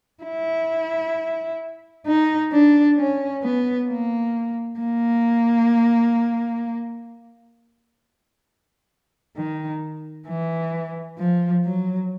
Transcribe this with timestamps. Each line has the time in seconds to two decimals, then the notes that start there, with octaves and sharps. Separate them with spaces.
0.24 E4
2.06 D#4
2.52 D4
2.98 C#4
3.43 B3
3.89 A#3
4.80 A#3
9.37 D#3
10.28 E3
11.19 F3
11.65 F#3